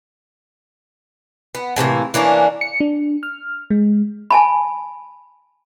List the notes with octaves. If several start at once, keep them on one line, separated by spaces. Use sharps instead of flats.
B3
A2 C3 E3 A#3
E3 A#3 C#4 D4
C#7
D4
F6
G#3
G#5 A5 B5